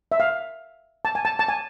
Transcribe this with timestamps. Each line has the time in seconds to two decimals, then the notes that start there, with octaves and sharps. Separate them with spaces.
0.12 E5
0.20 F5
1.05 A5
1.15 G#5
1.25 A5
1.39 A5
1.48 G#5